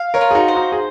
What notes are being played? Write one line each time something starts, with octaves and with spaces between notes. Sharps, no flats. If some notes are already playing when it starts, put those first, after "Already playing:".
Already playing: F5
A#4 C#5
F4
G#4
D#4 F#4
C5
D#4 F#4
G#4